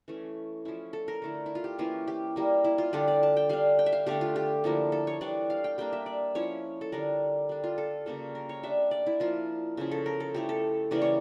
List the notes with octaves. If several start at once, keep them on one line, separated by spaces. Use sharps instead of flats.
E3 A3 C#4
F3 C#4 E4
A4
A#4
D3 A3 E4
E4
F4
G4
E3 A#3 C#4 E4 F4
G4
G3 A#3 E4
E4
F4
D3 G3 D4 G4
D5
A5
G5
G3 D4 F5
G5
E5
F5
D3 A3 D4 G4
F4
G4
D3 F3 A#3 E4
A4
C#5
E3 G3 D4 D5
F5
G5
G3 A#3 D4 G5
E5
D5
F3 C#4 E4 C#5
A4
D3 G3 D4 A#4
G3 D4
F4
A4
C#3 G3 A#3 C#4 A4
A#4
C#5
G3 D4 E5
D5
E4
F3 A#3 E4 F4
C#3 F3 C#4
A4
A#4
A4
F3 A3 E4 G4
A4
C#3 E3 G3 A#3 D5
C#5